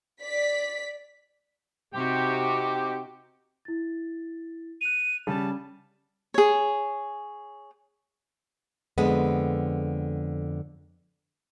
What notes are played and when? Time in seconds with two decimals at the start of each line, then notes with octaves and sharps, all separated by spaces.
0.23 D5 B6
1.94 C3 C4 D#4 F#4 G4
3.65 E4 A6
4.81 F#6 D#7 F7
5.27 C#3 G3 A5
6.34 G#4 C#5
8.98 F2 D3 G#3 B3